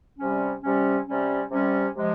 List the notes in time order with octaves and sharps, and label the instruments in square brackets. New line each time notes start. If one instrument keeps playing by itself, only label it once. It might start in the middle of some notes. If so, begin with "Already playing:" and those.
[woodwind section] C3 G3 C#4
C3 G3 C#4
C3 G3 C#4
C3 G3 C#4
C3 F3 G#3